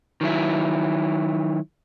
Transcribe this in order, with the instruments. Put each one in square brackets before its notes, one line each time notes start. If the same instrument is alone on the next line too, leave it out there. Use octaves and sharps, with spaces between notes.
[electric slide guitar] D#3 F#3 E4